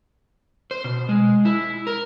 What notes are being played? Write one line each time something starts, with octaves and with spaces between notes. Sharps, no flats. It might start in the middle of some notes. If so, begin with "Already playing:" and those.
C5
B2
G#3
E4
A#4